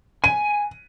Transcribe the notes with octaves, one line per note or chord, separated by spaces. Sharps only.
G#5 D#7